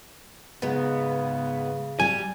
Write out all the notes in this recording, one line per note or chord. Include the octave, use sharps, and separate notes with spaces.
G#2 C#3 G#3 B3
G3 G4 G#5